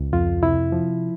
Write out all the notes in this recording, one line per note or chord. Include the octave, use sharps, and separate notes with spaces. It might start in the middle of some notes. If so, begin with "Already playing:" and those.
Already playing: C#2
F2 F4
C3 E4
F3